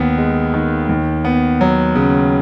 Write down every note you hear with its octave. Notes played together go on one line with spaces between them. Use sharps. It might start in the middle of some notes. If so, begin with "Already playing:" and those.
Already playing: D#2 B3
G#3
D#3
D#2
B3
F#3
C#3